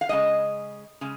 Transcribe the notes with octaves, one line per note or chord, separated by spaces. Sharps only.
F5
C#3 G#3 D#5
C#3 G#3